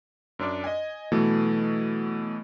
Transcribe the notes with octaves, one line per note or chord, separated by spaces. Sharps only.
F#2 D4 D5
D#5 G#5
B2 E3 F#3 A3